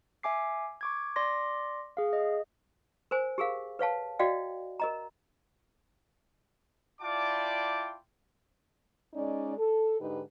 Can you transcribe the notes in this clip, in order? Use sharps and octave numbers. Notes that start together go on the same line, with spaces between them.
E5 G#5 D6 C7
C#6 D6 G#6
D5 C6 D6 A#6
G#4 F5
D#5
A#4 C5 G#5
G4 G#4 A#4 F5
B4 C#5 F5 A5
F#4 D5 D#5 F5 G5
A#4 D#5 A#5
E4 F4 D5 G5 A5 D6
G#3 C#4 D#4 D5
A4
G#2 D3 D#4 G4 B4